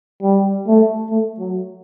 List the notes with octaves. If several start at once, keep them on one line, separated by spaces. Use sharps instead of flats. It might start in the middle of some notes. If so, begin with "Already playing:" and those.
G3
A3
A3
F#3